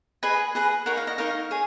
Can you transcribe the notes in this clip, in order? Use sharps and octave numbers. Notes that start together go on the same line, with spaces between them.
G#4 B4 D#5 G#5
G#4 B4 D#5
D#4 A#4 C#5 F#5
F5
D#5
D#4 A#4 C#5 F5
G#4 C#5